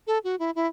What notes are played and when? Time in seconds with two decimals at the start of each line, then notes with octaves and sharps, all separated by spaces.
0.07 A4
0.24 F#4
0.39 E4
0.55 E4